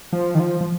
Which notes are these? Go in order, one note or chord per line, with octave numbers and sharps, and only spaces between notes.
F3
D#3
F3
F3